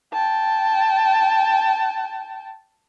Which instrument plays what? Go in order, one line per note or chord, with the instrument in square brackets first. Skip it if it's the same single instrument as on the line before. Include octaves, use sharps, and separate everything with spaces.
[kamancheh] G5 A5